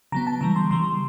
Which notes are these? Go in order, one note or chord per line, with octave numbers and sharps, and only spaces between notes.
C#3 F#3 B3 A#5
A5
C#3 E3 G3 A#5
C6
C#3 E3 G3 C6